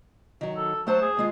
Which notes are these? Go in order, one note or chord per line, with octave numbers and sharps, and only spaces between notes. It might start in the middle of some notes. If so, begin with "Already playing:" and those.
D#3 F#3
A4
F#3 A3 C5 A5
G#4
D#2 G#3 F4